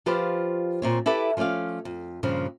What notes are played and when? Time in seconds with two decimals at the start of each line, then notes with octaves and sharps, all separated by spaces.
0.06 F3 F4 G4 B4 C5 D5
0.82 A#2 C4 C#5
1.06 E4 G4 A4 B4 D5
1.37 F3 A3 C#4 D5 F5
1.85 F2
2.23 G2 A#2 C#3 F3 G3 C4